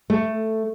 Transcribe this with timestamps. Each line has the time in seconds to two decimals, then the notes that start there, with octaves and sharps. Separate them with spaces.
0.10 A3